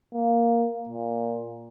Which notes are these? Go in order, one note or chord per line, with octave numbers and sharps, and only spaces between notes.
A#3
A#2